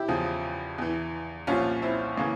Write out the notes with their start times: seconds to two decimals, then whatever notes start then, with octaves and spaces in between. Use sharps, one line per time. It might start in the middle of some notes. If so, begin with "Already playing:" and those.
Already playing: E4 G4
0.08 E2 C#3 F3
0.78 E2 E3
1.47 C2 A#2 F3 C#4 F4
1.82 C4 E4
2.17 C#3 E3 A#3 C#4